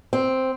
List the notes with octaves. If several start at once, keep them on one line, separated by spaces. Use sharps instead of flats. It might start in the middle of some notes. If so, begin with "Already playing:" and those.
C4